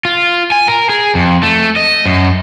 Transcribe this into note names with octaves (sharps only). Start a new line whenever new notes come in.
F4
G#5
A#4
G#4
F2
A3
D#5
F#2